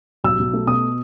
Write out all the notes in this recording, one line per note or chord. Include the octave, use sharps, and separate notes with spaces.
B1 E6
B1
A3
B2 D#6